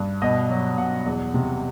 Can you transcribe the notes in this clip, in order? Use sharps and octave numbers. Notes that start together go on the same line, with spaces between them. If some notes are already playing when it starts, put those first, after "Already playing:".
Already playing: G2
B2 D#5
F#3
B2 F#5
E2
C3